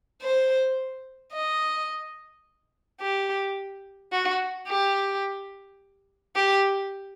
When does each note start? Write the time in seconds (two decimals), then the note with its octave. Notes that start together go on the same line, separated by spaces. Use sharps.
0.22 C5
1.33 D#5
3.01 G4
4.12 F#4
4.68 G4
6.36 G4